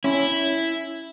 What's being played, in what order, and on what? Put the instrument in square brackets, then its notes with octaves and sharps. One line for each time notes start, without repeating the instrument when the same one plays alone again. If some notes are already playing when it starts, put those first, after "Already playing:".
[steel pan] C#4 [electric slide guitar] E4